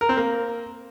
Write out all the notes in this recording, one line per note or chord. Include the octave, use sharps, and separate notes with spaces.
A#4
C4
A#3